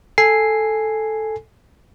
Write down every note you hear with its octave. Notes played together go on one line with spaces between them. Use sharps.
A4 G#5 C7